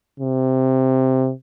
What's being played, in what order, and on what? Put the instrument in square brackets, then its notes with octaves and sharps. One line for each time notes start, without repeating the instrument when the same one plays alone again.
[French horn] C3